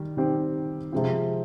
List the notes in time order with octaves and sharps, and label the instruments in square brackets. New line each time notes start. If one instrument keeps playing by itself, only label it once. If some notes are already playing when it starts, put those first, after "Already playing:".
Already playing: [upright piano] D#3 G3
D#3 G3 C4 G4
C3 F3 G#3 C4 F4